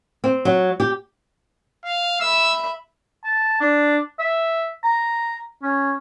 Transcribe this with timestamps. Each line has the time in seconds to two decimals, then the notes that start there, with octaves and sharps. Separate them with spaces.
0.24 C4
0.45 F#3
0.80 G4
1.85 F5
2.21 E5 B5 E6
3.24 A5
3.61 D4
4.19 E5
4.84 A#5
5.63 C#4